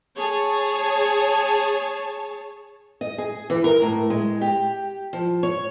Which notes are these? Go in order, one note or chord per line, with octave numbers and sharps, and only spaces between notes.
G#4 C#5 A5
D#5
G#4
E3
A#4
A2
G#3
G4
F3
C#5